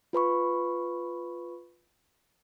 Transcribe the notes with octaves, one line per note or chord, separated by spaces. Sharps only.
F4 B4 B5 C#6